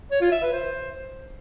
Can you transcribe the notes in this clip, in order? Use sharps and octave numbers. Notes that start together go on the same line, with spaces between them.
C#5
F4
E5
B4
C5